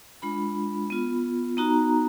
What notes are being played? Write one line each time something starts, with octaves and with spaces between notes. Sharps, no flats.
G#3 D4 F4 B5
B3 F4
B3 D#4 F#4 A#5